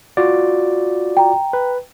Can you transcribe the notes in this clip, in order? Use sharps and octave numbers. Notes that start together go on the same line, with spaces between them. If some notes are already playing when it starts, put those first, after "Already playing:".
F4 F#4 D5
G5 A#5
B4